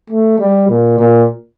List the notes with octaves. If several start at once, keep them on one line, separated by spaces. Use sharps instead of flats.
A3
G3
A#2
A#2